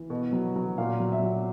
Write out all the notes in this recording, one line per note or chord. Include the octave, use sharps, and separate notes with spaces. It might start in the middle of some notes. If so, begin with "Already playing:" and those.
Already playing: E3
B2
F#3
F#3
A#2 F5
F#3
E5
F#3